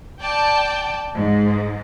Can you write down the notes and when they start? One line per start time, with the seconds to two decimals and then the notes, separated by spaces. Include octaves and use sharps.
0.21 D5 G5 A5
1.15 G#2